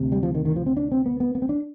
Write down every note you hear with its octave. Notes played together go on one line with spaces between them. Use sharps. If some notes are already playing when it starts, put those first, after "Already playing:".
Already playing: D2 C3
G3
F3
D#3
D#3
F3
C4
D4
C4
B3
B3
B3
C4
D4